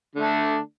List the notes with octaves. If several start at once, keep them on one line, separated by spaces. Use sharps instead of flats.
D3 A3 D4